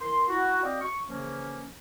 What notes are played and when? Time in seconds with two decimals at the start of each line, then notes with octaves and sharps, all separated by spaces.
0.01 E3 E4 A#4 C6
0.29 E4 F#4
0.63 C4 F#4 D5 D#5 F5 G5
0.81 C#6
1.09 C#3 E3 F3 A#3 C#4